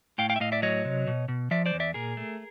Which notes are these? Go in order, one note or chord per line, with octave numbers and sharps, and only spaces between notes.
A2 F5 G5
F5 G5
E5
A2 D#5 F5
D5 E5
F#3 C#5 D#5
C3
B2
B2
F3 D5 E5
C5 D5
E2
D5 E5
A#2 G#4 A#4
A3